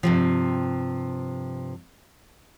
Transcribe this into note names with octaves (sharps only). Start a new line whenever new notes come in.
G2 C3 F3